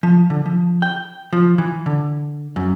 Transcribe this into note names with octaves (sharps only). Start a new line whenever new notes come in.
F3
D3
F3
G5
F3
E3
D3
F#2